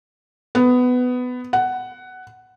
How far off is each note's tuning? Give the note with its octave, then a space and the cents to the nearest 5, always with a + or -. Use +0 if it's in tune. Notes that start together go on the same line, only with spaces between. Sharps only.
B3 +15
F#5 +10